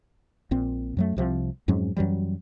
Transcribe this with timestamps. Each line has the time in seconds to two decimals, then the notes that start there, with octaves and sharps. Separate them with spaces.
0.51 A#1 A#2 C4
0.97 F#2 F#3 A3
1.17 C2 C3 F3
1.68 F2 G#2 F#3 C#4
1.97 F#2 E3 F#3 G3